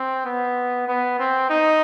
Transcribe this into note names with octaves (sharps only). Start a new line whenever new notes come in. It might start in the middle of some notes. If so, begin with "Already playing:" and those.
Already playing: C4
B3
B3
C4
D#4